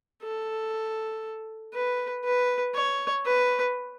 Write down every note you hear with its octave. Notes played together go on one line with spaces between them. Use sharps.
A4
B4
B4
C#5
B4